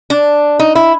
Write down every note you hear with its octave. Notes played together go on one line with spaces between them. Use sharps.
D4
D#4
E4